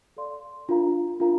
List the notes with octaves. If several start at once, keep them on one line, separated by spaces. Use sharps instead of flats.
A4 D5 F5 C6
D4 F4 A#4 F5 A#5
D4 F4 A#4 F5 A#5